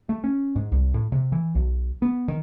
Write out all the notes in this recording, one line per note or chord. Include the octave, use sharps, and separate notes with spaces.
A3
C#4
G#2
C2
A2
C3
E3
B1
B3
D#3